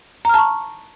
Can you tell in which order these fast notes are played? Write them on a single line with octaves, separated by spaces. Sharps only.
A#5 F6 A5 C#6